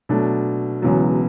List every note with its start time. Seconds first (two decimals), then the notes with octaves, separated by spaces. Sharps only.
0.09 B2 F#3 A3 D4
0.82 E1 E2 C#3 F#3 B3